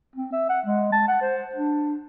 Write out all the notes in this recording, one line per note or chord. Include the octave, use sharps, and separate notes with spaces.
C4
E5
F#5
G#3
A5
F#5
C5
D4